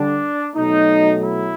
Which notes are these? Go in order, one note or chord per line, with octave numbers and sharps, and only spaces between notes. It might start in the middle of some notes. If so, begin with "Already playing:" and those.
Already playing: D3 G3 D4
B2 F#3 A3 D#4
E4